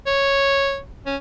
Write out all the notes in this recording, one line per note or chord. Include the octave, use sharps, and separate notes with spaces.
C#5
C#4